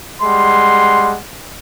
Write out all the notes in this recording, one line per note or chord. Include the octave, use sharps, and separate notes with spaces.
G3 G#3 F#5 C6